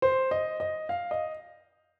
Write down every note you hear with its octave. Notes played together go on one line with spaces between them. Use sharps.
C5
D#5
D#5
F5
D#5